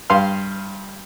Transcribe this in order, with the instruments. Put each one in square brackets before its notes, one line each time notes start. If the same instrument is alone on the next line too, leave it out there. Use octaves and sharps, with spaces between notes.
[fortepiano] G2 F5 C6 F6